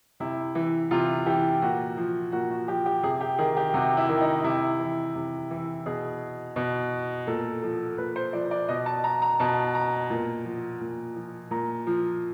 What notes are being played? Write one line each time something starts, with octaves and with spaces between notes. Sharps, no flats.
C3 E4
E3
C3 F4
E3 G4
A#2 F#4
F3
A#2 F#4
F#4
F3 G4
G4
C3 G#4
G4
D#3 G#4
G4
C3 F#4
E4
D#3
D#4
C3 E4
E3
C3
E3
B2 G#4
B2
A#2 A4
F3 A4
A#2 B4
C5
F3 D5
D5
B2 D#5
A5
A#5
A#5
B2 A5
A#5
A#2
F3
A#2
F3
A#2 A#5
F3